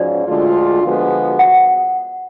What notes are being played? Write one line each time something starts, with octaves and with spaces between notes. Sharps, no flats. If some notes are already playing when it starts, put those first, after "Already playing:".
Already playing: G#2 F3 C#4 F#4 D5
D2 D3 G#3 D4 F4
D3 F3 G#3 B3 F#4
F#5